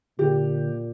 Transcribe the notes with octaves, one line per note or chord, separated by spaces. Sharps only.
A#2 D3 G4